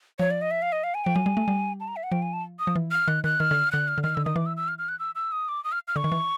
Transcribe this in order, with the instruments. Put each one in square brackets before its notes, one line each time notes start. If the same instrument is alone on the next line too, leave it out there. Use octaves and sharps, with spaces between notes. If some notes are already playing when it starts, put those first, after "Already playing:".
[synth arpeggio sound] F3 [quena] C#5
[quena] D5
D#5
E5
F5
D#5
F5
G#5
[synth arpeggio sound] F3 [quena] G5
[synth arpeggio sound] F#3 [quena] G#5
[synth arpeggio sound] G3
A3
G3
[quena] A5
A#5
E5
F#5
[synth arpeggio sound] F3 [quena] G5
[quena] G#5
A5
D#6
[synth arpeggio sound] F3
E3
[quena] F6
[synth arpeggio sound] D#3 [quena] F#6
[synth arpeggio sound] D#3 [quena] F#6
[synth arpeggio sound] D#3 [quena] F6
[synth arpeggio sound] D3
[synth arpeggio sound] D3 [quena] F#6
[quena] F6
[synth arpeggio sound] D3
[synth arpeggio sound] D#3 [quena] F6
[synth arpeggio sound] D3 [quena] E6
[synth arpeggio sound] D#3 [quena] D#6
[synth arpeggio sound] E3 [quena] D6
[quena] E6
E6
F6
F6
F#6
E6
E6
D#6
D6
D#6
F6
F6
[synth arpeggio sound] D3 [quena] C#6
[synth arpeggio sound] D#3
E3